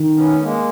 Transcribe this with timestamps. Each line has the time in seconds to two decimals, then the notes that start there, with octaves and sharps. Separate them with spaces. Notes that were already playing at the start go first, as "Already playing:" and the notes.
Already playing: D#3
0.15 B3 C#4
0.33 A3
0.42 G#3 A#3